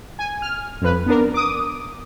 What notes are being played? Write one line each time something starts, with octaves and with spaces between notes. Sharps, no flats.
G#5
F6
F2 B4
B3 D4 A#4
D6 D#6